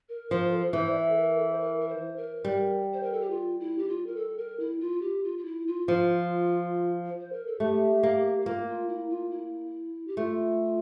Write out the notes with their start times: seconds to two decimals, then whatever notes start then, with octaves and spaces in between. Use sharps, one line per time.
0.09 A#4
0.31 F3 C5
0.47 A#4
0.52 A4
0.73 E3 C5
0.90 D5
0.95 E5
1.10 A4
1.17 A#4
1.38 A4
1.52 C5
1.60 A#4
1.81 A#4
1.89 C5
2.17 A#4
2.45 G3
2.93 C5
3.03 A#4
3.13 A4
3.21 G4
3.30 F4
3.60 E4
3.78 G4
3.89 F4
4.07 A#4
4.16 A4
4.38 A#4
4.60 E4
4.80 F4
5.02 G4
5.24 F4
5.38 F4
5.45 E4
5.67 F4
5.88 F3 F4
7.20 C5
7.32 A#4
7.47 A4
7.60 A3 G4
8.03 A#3
8.41 G4
8.45 A#3 F4
8.67 F4
8.88 E4
9.10 F4
9.31 E4
10.07 G4
10.17 A3 F4